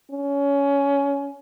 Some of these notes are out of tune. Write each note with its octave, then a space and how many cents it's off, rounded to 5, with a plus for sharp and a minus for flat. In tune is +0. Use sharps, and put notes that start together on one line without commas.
C#4 +20